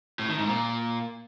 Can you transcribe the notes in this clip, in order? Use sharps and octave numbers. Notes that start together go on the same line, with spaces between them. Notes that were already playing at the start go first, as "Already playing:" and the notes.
A2
D#3
G#2
A#2